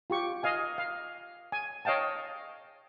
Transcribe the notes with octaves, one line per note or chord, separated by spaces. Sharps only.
F4 G4 C#6
D#5 F5 G#5
F5
G#5
C#5 D#5 F5 G5 A5